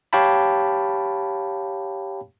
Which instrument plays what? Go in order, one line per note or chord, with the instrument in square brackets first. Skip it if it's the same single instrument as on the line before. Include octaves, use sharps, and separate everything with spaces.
[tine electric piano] G4 C#5 F5 G5 A5 B5